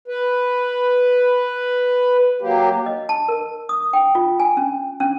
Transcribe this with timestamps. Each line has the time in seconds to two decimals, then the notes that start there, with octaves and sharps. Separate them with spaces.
0.08 B4
2.41 F#3 A#3 G4
2.86 D#5
3.09 A5
3.28 A#4
3.69 D#6
3.93 G5
4.15 F4
4.40 G#5
4.57 C#4
5.00 C#4